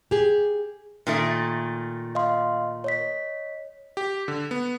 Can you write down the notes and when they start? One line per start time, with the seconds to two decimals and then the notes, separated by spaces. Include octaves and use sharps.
0.11 G4 G#4
1.07 A#2 D#3 A3
2.15 D#5 F5 C6
2.84 C#5 D#5 B6
3.97 G4
4.28 D3
4.51 B3